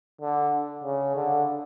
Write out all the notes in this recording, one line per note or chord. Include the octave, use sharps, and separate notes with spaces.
D3
C#3
D3